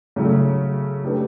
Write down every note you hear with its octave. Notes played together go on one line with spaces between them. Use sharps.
C#3 F#3 A3
A3 D4 G4 B4